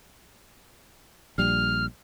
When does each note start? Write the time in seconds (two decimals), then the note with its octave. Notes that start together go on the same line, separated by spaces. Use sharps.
1.38 A#1 G3 F6